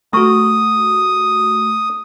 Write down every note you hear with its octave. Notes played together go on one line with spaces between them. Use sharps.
A3 F#4 A#5 C#6 D#6